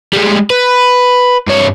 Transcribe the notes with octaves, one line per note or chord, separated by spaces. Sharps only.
G3 G#3
B4
G2 C#5